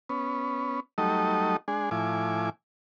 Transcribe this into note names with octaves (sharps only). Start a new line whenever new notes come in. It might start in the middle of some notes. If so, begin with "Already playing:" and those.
B3 C#4
F#3 G3 A3 D#4 A4 D#5
G#3 D4 G#4
A2 F3 E4 G#5 D6